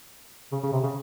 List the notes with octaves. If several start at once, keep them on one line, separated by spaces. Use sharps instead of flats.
C#3
C#3
C3
C#3